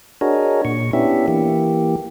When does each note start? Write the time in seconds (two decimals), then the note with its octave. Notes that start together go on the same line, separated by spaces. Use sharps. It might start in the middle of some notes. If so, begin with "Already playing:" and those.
0.21 D4 F#4 G#4 A#4 C#5 D#5
0.65 A#2 C#6
0.93 B3 C#4 D4 E4 G4 E5
1.28 E3 A#3 G4